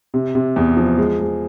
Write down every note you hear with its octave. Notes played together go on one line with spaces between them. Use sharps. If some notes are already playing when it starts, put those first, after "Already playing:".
C3
C3
E2
F3
G#3
G#3